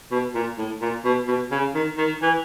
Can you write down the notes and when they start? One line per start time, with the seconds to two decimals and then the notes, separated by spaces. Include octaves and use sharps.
0.12 B2
0.35 A#2
0.58 A2
0.81 A#2
1.05 B2
1.28 B2
1.51 C#3
1.75 D#3
1.98 D#3
2.22 E3